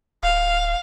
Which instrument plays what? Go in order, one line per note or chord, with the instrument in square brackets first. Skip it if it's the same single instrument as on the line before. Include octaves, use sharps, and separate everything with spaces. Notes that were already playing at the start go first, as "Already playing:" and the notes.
[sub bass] D1 [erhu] F5